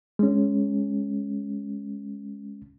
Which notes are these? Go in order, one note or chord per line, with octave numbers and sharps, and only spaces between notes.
G#3 C#4